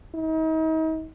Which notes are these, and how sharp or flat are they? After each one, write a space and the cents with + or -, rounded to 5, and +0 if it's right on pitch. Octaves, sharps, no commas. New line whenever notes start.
D#4 +40